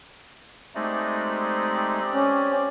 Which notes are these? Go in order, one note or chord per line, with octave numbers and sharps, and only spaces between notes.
G#3 A3 C4 D#4 G4 D5
C#4